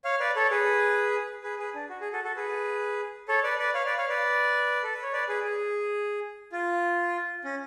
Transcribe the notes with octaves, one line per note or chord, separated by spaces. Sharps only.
C#5 F5
B4 D5
A4 C#5
G#4 B4
G#4 B4
G#4 B4
D4
F#4
G#4
F#4 A4
F#4 A4
G#4 B4
A4 C#5
B4 D5
B4 D5
C#5 F5
B4 D5
C#5 F5
B4 D5
A4
B4
C#5
B4 D5
G#4 B4
G#4
F4
C#4